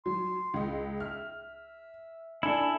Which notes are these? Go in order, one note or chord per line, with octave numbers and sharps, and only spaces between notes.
F#3 C6
C#2 D#5
E5 F6
D4 E4 A4 G#5